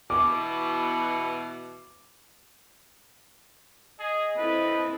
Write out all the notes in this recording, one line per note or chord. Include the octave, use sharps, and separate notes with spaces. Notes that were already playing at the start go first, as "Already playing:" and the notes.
B2 E3 D6
G#4 D#5
C4 E4 A4 B4